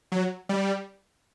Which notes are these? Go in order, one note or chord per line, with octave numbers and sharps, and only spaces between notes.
F#3
G3